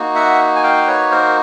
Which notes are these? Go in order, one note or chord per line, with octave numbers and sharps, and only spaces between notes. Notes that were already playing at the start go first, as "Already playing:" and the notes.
Already playing: A#3 D#4 F#4
E5 F#5
G#5
F5 G5
B4 C#5
A#4 C5